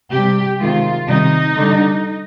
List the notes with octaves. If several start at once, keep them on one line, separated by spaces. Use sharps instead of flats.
C3 G3 G4
C3 D#3 G#3 F4
C3 D#3 G3 D#4
D3 G3